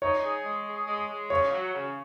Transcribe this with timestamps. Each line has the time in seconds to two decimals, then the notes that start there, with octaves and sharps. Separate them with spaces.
0.02 D#4 C#5
0.23 G#4
0.44 G#3
0.67 G#4
0.88 G#3
1.09 G#3
1.30 C#3 C#5
1.51 F#3
1.73 C#3